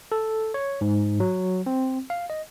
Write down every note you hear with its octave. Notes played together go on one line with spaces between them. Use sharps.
A4
C#5
G#2
F#3
C4
F5
D#5